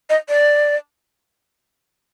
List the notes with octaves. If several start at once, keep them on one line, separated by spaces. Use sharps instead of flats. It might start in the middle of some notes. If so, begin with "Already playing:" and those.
D#5
D5